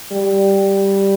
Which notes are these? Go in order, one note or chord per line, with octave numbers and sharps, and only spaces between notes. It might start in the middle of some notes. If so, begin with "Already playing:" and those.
G3